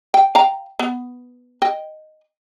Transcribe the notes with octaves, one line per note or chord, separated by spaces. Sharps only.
G5
F5 G5 A#5
B3
D#5 G5